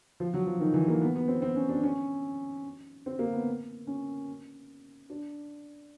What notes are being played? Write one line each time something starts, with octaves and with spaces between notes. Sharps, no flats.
F3
F#3
F3
D#3
E3
A#3
B3
B3
C4
C4
C#4
D4
C#4
C4
A#3
B3
C#4
D4